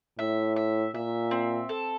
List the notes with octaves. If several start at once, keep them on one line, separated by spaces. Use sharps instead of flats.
A2 E5
E5
A#2 E5
C4
A4